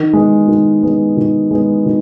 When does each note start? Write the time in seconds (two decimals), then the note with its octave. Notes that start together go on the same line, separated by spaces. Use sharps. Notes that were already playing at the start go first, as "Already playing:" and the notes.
Already playing: D#3
0.13 G#3 B3
0.48 D#3
0.83 G#3 B3
1.17 D#3
1.51 G#3 B3
1.86 D#3